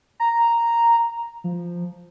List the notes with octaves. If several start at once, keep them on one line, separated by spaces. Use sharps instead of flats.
A#5
F3